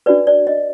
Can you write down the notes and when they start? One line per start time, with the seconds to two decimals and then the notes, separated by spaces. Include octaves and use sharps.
0.06 D4 F#4 B4 D5
0.27 D5
0.47 D#5